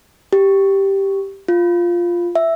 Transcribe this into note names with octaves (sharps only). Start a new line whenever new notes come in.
G4
F4
E5